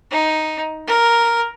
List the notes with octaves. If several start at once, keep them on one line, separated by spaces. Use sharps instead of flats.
D#4
A#4